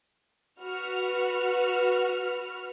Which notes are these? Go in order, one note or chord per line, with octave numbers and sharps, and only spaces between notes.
F#4 B4 F6